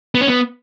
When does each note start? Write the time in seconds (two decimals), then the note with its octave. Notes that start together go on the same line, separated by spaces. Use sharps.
0.15 B3
0.21 C#4
0.27 B3